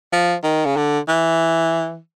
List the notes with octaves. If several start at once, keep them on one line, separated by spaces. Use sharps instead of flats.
F3
D#3
C#3
D3
E3